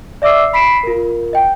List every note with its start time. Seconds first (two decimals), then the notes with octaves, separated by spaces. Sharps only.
0.22 D5 E5 D6 E6 C7
0.53 B5 B6 C7 D7 E7
0.83 F4 A#4
1.33 D#5 G5